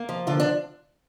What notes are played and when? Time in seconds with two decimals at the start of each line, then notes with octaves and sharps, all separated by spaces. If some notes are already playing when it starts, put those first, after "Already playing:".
Already playing: A#3
0.09 F3
0.27 D3 F4
0.40 D4